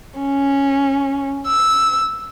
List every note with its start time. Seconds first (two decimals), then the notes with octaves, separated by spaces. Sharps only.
0.20 C#4
1.47 E6